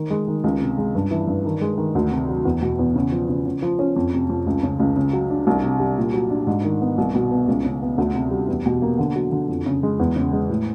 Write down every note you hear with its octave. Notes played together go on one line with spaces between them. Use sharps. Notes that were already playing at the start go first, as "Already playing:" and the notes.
Already playing: D#3
G#3
D#3
C#2
C3
G#3
G2
E3
G2
D#3
G#3
D#3
D2
C3
F#3
E2
B2
E2
C#3
F3
C#3
C#3
F3
C#4
F2
C3
F2
C#2
C#3
C#2
C#3
F#3
D4
C2
C3
G3
A#2
F#3
D4
G#2
D#3
B3
C2
B2
B3
C#2
C#3
B3
D2
C3
G3
E2
B2
A#3
D3
F#3
D3
F2
C#3
G#3
E2
C#3
G#3
A2